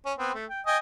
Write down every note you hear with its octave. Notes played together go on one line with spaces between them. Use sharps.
C#4
B3 C4
A3
G5
D#5 G5 G#5